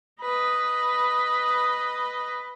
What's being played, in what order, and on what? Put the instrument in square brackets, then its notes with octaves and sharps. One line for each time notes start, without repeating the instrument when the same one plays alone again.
[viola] B4 D#5